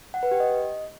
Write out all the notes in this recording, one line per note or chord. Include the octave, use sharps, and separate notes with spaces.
F#5
B4
G4
D#5